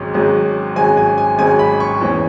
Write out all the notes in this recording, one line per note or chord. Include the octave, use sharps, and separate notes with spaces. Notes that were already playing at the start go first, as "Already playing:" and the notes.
Already playing: G#1 G#2 F#3 C#4
G#1 G#2 F#3 C#4
G#1 G#2 F#3 C#4 G#5
G#5
G#5
G#1 G#2 F#3 C#4 G#5
B5
C#6
E2 E3 C#4